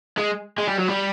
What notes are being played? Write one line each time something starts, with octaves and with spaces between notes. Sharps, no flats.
G#3
G#3
G3
F#3
G3